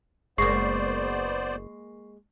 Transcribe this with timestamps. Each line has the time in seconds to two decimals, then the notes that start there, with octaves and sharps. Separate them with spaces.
0.38 F#1 G#3 A#3 B3 C5 D5 C#6 C7